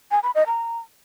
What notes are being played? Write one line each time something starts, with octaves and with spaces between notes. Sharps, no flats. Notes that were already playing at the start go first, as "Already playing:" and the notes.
G#5
B5
D#5
A#5